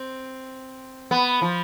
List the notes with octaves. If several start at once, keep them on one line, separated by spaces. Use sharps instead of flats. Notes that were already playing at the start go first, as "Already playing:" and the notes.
Already playing: C4
B3
F3